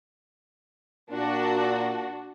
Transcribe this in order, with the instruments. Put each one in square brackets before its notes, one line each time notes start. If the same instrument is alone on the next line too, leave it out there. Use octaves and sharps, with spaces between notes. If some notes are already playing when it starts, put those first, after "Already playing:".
[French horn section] A#2 [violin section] D4 F#4